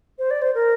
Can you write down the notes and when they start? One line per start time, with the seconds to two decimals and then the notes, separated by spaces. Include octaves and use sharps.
0.19 C5
0.31 D5
0.42 C5
0.55 A#4